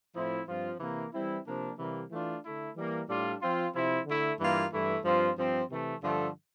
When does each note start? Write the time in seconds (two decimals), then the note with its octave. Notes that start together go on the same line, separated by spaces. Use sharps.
0.15 A2 F3 C4 E4
0.48 G2 F3 C4 F4
0.80 C3 E3 A#3
1.13 E3 G3 C4 E4
1.46 C3 F3 A#3 D4
1.78 C3 E3 G3 A#3
2.11 E3 A3 D4 F4
2.44 D3 A3 E4
2.76 E3 G3 A#3
3.09 A2 G3 D4 F4
3.41 F3 C4 F4
3.74 C3 F3 C4 E4
4.06 D3 A3 E4
4.39 G2 E3 A#3 F4
4.72 G2 E3 A3 E4
5.04 G2 F3 C4 F4
5.37 G2 F3 C4
5.69 C3 E3 A3
6.02 G2 D3 F3 A3